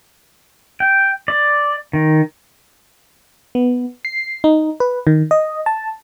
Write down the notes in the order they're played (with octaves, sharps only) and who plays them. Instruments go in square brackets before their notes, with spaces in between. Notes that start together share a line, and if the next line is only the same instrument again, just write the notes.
[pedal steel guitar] G5
D5
D#3
[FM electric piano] B3
C7
D#4
B4
D#3
D#5
A5